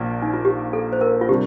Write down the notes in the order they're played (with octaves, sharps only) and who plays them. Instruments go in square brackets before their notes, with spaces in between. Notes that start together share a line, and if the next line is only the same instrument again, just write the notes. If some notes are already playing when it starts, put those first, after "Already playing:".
Already playing: [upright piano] A#1 A#2 F3 A#3
[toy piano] D#4
F4
G4
A4
C5
A#4
F4
[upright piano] C3 G3 D4 [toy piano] G4